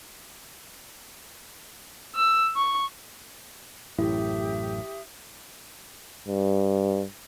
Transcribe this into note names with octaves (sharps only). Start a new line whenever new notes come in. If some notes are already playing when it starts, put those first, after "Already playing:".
E6
C#6
A1 F#2 A2 E4 G4 E5 D#6
G2